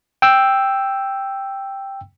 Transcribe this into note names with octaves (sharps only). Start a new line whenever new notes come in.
G5 E6